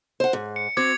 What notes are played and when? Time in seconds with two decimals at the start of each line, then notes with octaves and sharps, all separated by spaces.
0.20 C5 F#5
0.33 G#2
0.56 C#7
0.77 C4 F#4 C5 D6 G#6 C#7